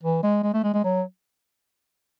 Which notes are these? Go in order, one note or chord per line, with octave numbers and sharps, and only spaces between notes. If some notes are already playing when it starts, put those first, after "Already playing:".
E3
G#3
G#3
A3
G#3
G#3
F#3